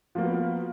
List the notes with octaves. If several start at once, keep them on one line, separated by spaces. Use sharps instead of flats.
F3 A#3 B3 F#4